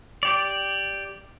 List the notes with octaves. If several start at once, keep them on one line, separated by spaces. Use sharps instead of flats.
G4 D5